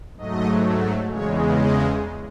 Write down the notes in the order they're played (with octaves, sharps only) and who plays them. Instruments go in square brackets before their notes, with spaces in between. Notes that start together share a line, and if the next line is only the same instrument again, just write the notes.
[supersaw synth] G#2 F#3 A3 D#5
E2 C#3 G#3 C#5
D#5